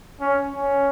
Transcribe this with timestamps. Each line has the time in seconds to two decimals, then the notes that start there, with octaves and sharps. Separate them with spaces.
0.21 C#4
0.55 C#4